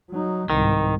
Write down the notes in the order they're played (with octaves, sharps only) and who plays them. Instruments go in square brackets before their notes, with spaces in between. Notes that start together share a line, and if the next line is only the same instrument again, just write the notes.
[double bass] F#3 D#4
[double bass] C2 G#2 [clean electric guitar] D#3